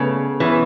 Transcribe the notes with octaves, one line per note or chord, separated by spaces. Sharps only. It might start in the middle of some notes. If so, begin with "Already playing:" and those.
Already playing: C#3 A3 B3
E3 B3 C#4